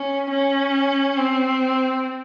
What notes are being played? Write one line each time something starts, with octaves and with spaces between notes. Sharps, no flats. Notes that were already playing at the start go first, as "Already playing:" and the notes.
Already playing: C#4
C#4
C4